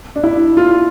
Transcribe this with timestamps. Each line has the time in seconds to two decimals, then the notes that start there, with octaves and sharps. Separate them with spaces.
0.16 D4
0.23 E4
0.57 F4